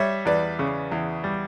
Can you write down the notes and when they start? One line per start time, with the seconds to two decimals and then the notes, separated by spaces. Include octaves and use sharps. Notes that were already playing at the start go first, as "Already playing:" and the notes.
Already playing: G3 C#5 E5
0.26 E2 B4 D5
0.59 C#3
0.92 E2
1.24 G3